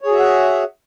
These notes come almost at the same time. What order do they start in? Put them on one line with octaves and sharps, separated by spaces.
C#5 G#4 F#4 E5 F#5